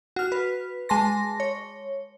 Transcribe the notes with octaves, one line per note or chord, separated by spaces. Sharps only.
F#4 F6
B4
G#3 A5 C6 A#6
C#5